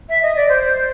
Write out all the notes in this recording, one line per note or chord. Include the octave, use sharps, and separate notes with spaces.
E5
D#5
D5
C5